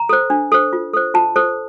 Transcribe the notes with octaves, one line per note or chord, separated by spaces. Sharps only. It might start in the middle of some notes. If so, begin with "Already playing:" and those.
Already playing: A#5
A4 C5
D4
A4 C5
F4
A4 C5
F4 A5
A4 C5